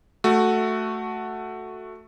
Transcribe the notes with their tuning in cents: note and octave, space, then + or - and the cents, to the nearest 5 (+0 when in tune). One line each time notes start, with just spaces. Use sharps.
A3 +0 F#4 +0